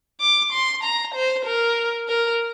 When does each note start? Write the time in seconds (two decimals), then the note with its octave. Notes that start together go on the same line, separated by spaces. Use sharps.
0.20 D6
0.52 C6
0.83 A#5
1.14 C5
1.45 A#4
2.08 A#4